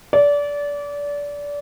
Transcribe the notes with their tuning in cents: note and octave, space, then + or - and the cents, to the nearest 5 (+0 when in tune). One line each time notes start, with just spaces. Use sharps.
D5 -25